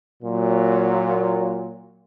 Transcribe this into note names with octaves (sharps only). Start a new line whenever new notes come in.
A#2 F#3